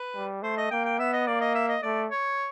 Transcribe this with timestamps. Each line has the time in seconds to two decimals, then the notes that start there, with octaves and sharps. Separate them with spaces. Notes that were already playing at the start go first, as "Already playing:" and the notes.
Already playing: B4
0.15 G3
0.42 A3 C5
0.57 D#5
0.71 A#3 G5
0.85 G5
0.99 B3 E5
1.13 D#5
1.27 A#3 D5
1.41 D#5
1.55 E5
1.69 D#5
1.83 A3 D5
2.11 C#5